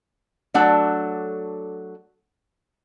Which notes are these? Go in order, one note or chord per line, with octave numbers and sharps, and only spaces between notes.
F#3 A3 D4 A4 F#5